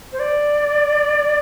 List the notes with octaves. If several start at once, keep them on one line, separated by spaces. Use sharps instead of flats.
C5
D5